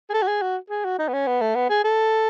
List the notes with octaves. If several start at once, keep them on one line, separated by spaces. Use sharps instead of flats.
G#4
A4
F#4
G#4
F#4
G#4
F#4
D#4
B3
C#4
B3
A3
B3
G#4
A4